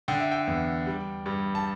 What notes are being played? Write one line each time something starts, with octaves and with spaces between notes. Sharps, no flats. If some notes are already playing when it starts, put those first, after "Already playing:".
D3 G5
E5
G5
E2
G3
G2
A5